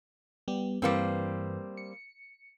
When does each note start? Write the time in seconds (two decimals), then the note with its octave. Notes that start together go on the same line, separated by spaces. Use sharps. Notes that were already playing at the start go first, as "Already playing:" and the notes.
0.48 G3 B3 G4
0.82 G2 E3 G3 A#3 C4 B4
1.77 C#7